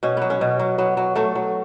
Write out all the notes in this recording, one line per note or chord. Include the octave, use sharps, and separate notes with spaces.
B2 C#4
F#3 B3
C#4
B2
F#3
F#3 B3
F#3
F#3 A3
F#3